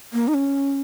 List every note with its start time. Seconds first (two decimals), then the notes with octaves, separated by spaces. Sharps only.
0.13 A#3
0.28 D#4
0.34 C#4